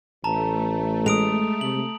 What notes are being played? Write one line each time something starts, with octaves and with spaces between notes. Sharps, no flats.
A1 A3 A5 A#5
G#3 D#6 D7 F7
C3 F#7